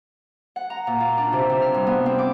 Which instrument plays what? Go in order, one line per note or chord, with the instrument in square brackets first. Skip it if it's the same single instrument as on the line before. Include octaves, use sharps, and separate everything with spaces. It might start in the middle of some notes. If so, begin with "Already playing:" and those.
[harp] F#5
A#5
A#2
F4
D4
C3
C3
F6
G2
B3
C4
D6